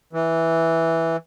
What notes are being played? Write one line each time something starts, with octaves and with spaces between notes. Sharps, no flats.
E3